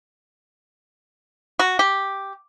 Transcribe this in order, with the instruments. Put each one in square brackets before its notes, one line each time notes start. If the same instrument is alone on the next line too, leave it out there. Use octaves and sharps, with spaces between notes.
[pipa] F#4
G4